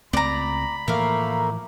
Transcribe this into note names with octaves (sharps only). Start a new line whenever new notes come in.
C#2 A3 C4 D5 A#5 B5
A2 E3 F3 A3 A#3 A#4 F5